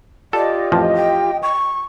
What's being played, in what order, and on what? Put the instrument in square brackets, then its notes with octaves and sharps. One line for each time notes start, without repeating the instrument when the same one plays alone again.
[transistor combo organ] F4 G4 [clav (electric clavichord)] A4 [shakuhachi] D5 [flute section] D#5
[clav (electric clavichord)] A1 F2 F3
[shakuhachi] G5
C#6